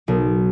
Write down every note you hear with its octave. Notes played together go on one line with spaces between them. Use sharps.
B1